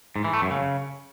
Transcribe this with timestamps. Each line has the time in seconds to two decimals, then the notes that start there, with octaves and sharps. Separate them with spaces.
0.16 G#2
0.24 E3
0.33 A3
0.42 F#2
0.51 C#3